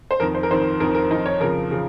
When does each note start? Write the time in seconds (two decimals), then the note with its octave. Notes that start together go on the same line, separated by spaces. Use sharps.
0.11 C5
0.20 F2 D#3 A#4
0.35 C5
0.43 A#4
0.51 F2 D#3 C5
0.80 F2 D#3 A#4
0.95 A#4
1.11 F2 D#4
1.14 D#3
1.26 C#5
1.40 F2 C#3 F3 A#4
1.71 C#3 F3